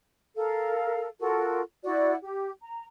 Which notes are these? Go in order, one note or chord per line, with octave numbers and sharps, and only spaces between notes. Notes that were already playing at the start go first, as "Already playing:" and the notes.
A4 A#4 F5
F4 F#4 A4 A#4
E4 F#4 D5 F#5
G4
A#5